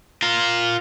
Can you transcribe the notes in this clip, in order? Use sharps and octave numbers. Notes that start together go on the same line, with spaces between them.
F4 A#4